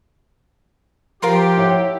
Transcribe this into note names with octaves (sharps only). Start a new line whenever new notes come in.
F3 F4 G4 A#4 C6
E4 C#5 F#5